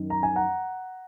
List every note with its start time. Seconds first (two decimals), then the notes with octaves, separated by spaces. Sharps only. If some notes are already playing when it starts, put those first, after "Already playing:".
Already playing: F#2 D#3
0.10 A#5
0.23 G#5
0.36 F#5 A#5